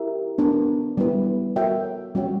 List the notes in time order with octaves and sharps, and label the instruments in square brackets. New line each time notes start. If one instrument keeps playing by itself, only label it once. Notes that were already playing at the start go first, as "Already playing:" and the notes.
Already playing: [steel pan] E4 G4 A#4 E5
B3 D4 A#4 D5
G3 B3 E4 B4
F#4 A#4 C#5 E5 G5
G3 C#4 F#4 C#5 G5